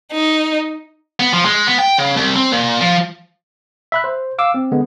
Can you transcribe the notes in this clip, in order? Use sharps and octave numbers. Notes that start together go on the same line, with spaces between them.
D#4
B3
F3
G#3
B3
G5
C#3
C2
C4
A#2
F3
E5 B5 F#6
C5
F5 D6 E6
C4
D3 G#3 B3